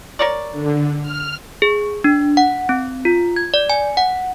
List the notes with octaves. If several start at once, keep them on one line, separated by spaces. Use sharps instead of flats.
A#4 C#5 D5
D3
F6
G#4
D4
F#5
C4
F4
G#6
D5
G#5
F#5